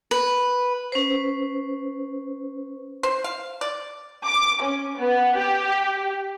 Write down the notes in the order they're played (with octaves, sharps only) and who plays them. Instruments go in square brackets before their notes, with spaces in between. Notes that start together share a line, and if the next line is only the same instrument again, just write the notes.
[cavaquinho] B4
[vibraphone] C#4 B4 C5
[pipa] C5
F5
D5
[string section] D6
C#4
B3
G4